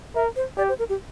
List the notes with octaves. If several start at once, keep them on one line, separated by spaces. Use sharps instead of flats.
A#4 E5
C5
G4 D5
C5
A#4
G4